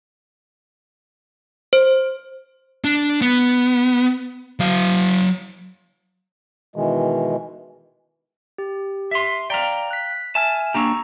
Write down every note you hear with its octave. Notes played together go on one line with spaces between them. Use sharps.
C5
D4
B3
F#3 F5
B2 D#3 E3 G#3
G4
E5 C6
D5 F5 G5 A#5
F#6 B6
E5 G#5 A5 F6
A#3 D4 G4 A#5 C#6 E6